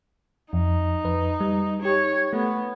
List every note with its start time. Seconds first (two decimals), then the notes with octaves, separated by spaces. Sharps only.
0.53 F2 D#4
1.05 F2 B4
1.40 G3
1.82 D#4 G4 C#5
2.33 A3 B3